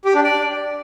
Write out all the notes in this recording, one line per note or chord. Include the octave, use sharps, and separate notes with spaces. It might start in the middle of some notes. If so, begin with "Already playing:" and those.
G4
D4
D5